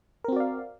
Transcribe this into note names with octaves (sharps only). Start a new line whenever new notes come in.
C4 F#4 A#4 D5 F5